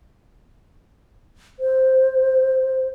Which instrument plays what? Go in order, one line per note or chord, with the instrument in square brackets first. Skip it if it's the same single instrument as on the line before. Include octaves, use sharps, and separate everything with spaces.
[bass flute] C5